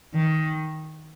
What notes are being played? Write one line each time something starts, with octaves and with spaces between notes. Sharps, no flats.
D#3